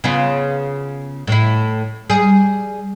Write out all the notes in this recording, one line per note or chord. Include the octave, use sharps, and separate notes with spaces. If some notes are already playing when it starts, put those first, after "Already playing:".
C#3 B3 F4
A2 E4
G3 G#4